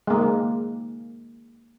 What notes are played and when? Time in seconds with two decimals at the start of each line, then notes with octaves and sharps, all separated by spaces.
0.07 G#3 A#3